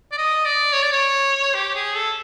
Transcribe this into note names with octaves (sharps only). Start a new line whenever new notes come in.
D5
D#5
D5
C#5
D5
C#5
G4
G#4
A4